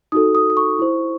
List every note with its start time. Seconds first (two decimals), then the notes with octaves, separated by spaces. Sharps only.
0.12 D#4 F#4 A4 D#6
0.35 D#6
0.50 D#6
0.57 C#6
0.79 E4 C5